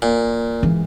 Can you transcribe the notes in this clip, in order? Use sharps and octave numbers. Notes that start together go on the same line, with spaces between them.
A#2
G#2 E3